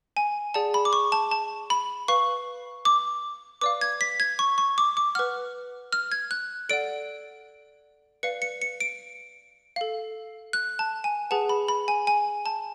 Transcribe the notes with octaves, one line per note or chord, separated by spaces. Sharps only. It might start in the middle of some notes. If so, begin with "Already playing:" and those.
G#5
G#4 D5 F#5 A5
B5
D6
C#6
A5
A5
B5
B4 F5 C#6
D6
B4 D5 F5 D6
G#6
B6
G#6
C#6
C#6
D6
D6
B4 F#5 F6
F6
G#6
F#6
A4 D5 F#5 D7
B4 D5 F5 C#7
C#7
C#7
D7
A4 F5
F#6
A5
G#5
G#4 B4 F#5 A5
B5
B5
G#5
G#5
A5